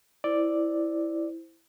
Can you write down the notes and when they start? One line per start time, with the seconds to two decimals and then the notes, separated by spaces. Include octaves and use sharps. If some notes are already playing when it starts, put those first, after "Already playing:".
0.24 E4 C5 D5